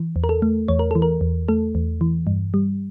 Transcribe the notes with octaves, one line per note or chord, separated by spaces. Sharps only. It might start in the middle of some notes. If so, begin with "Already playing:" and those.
Already playing: E3
E2
A#4
A4
A3
E2 C#5
A#4
E3 A4
A#4
E2
A3 A4
E2
E3
G2
G3